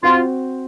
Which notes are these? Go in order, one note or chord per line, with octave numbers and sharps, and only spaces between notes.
C4 F4 F#4 C5